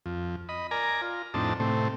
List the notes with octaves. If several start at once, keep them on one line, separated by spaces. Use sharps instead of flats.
F2
D#5 B5
A#4 D5 G#5 A#5
F4
F2 A2 C4 D4 D#4 A5
A2 C3 A3 C4